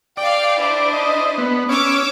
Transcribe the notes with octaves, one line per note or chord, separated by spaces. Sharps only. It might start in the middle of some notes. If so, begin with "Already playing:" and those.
D5 F5 G5
D4 E4 C5
D#5
B3
C#4 C#5 D6 E6